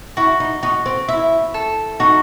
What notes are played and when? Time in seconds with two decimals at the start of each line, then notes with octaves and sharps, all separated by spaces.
0.17 E4 F#4
0.40 D#4
0.63 D#4 F#4
0.86 C4
1.08 E4 E5
1.54 A4
2.00 D#4 F#4